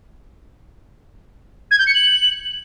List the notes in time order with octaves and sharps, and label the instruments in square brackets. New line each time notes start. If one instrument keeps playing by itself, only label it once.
[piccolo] G#6
G6
C#7
F#7